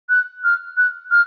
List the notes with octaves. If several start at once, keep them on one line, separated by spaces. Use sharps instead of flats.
F#6
F6
F#6
F6